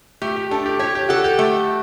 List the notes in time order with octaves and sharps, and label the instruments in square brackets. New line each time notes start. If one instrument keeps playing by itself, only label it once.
[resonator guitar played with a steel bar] A3 [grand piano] G4
[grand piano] G4
[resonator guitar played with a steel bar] D4 [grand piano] A4
[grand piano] G4
[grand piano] G4 [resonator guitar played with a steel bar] C#5
[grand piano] G4
[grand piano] F#4 [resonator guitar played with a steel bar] A4
[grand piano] G4
[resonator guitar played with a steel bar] A3